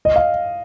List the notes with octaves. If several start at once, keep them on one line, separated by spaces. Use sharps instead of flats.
D#5
F5